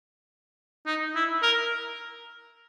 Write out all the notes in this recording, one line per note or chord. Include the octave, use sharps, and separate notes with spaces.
D#4
E4
A#4